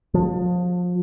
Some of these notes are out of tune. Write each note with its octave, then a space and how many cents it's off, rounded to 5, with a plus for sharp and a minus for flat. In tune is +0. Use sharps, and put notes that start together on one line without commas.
F3 +30